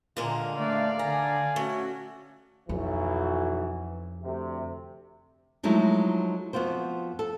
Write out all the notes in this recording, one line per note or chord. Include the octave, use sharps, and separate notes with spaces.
A#2 D3 G#3 A#3 F4
A3 D4 D5 F5
D3 G#5 A#5
A3 C#4 F#4
B1 F2 E3 F#4
D2 C3
F3 F#3 G#3 A3 D#4 E4
F2 B3 F4 F#4 C5
A4